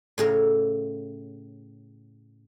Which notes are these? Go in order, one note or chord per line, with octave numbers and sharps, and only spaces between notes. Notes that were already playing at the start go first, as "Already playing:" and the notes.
A2 C#3 A#4